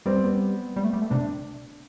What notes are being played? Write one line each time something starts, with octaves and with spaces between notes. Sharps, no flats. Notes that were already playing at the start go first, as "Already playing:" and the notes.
G3 C4
B3
G3
A3
G3
A3
C3 D4